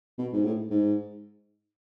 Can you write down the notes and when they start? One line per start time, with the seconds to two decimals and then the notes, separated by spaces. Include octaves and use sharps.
0.18 B2
0.33 G#2
0.44 A2
0.71 G#2